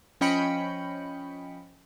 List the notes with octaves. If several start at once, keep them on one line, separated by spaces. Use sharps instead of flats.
F3 C#4 D#5 G5 B5 C#7